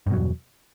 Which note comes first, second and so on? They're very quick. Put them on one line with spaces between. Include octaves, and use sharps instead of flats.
G2 B2 F#3 E2